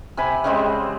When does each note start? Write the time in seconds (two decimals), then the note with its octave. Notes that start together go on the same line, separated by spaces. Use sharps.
0.17 C3 G#5 B5
0.44 C#3 G3 G#3 C4